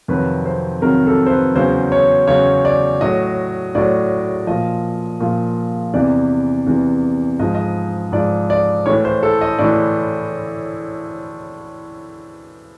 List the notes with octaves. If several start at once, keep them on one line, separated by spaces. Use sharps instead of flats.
F2 C3 D#3 F#3 B4
C5
F2 C3 D#3 F#3 A#4
A4
C5
B4
E2 C#3 F#3 C5
C#5
E2 C#3 F#3 C#5
D5
A2 F#3 D#5
A2 F#3 D5
A#2 F3 D#5
A#2 F3
E2 C3 E3 D5
E2 C3 E3
G#2 F3 D#5
D#5
G#2 F3 D5
D5
A2 E3 C#5
C5
A4
D#5
A2 E3 D5